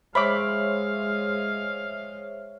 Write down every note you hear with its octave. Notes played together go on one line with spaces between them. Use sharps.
G#3 C5 C#5 E5 F5 B5 D6